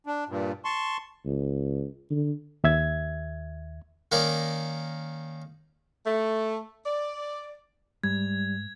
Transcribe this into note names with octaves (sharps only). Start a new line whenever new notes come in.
D4
G2 A#2
A5 C6 C#6
C#2
D3
D#2 E5 G#6
D#3 A#3 C#4 D5 A#5
A3
D5
G#2 G3 G#6